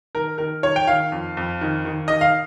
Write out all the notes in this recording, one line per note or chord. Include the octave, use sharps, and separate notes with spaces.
D#3 A#4
D#3 A#4
D#3 C#5
G5
D#3 F5
F2
F2
D#3
D#3
D#3 D#5
F5